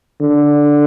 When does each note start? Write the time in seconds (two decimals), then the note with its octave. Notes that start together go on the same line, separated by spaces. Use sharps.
0.21 D3